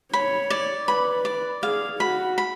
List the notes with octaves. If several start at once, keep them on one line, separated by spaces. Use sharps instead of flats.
C#5 B5
D5
B4 B5
D5
G#4 F5
F#4 B5
B5